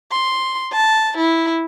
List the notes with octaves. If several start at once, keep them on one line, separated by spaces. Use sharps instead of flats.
C6
A5
E4